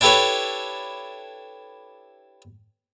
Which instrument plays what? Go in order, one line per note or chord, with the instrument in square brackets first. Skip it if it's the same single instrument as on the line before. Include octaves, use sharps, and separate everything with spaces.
[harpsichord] D4 E4 G4 A4 B4 C#5